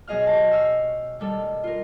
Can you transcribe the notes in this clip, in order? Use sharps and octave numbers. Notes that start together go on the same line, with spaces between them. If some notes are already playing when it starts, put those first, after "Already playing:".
B2 F#3 G#4 D#5 F5 F6
G4 A5
F5 C#6 E6 F6
D#3 G3 A4
F4 A#4